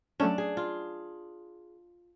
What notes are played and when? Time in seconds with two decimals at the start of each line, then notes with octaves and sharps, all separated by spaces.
0.20 F#3 A3 C#4 D4
0.38 G#4
0.57 F4